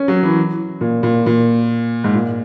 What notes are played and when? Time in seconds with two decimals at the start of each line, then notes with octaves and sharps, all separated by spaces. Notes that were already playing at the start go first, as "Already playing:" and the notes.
Already playing: C#4
0.08 F#3
0.23 E3
0.81 A#2
1.03 A#2
1.26 A#2
2.04 G#2
2.15 A#2